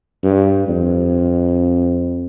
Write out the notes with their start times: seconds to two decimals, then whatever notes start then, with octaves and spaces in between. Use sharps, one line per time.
0.23 G2
0.69 F2